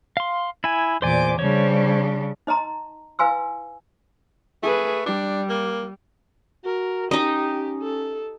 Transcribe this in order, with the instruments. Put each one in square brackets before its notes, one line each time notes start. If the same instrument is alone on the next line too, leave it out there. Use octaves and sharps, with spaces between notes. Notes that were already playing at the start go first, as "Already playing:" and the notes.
[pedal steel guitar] F5 C6
E4 G#5
[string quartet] E2 A#2 D6 [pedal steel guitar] C5 D5 G#5
[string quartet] C#3 G3 D4 [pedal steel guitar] C5 C#5
[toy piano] D#4 D#5 A5 A#5 C6
E4 B4 F5 G#5 C6 E6
[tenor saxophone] A3 [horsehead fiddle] G#4 B4
[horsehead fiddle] G3 [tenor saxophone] D4
[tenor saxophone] A#3
[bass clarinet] F#4 [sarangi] A#4
[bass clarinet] C#4 [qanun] D#4 D#5 [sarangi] G4
[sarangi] A4